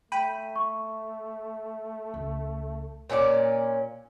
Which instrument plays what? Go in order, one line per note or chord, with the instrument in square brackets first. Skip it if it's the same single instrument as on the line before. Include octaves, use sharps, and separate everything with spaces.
[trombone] A3 [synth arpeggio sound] G5 B5 [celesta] D#7
[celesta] C#6
[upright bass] C#2
[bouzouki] A#2 C#4 G4 D5